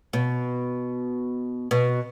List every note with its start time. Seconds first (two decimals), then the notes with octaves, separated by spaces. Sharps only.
0.13 B2
1.71 B2